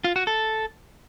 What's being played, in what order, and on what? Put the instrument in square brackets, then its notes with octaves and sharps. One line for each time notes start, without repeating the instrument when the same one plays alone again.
[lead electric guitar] F4
F#4
A4